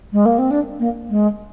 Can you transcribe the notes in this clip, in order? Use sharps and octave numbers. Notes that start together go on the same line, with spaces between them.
G#3
A#3
C4
D4
A#3
G#3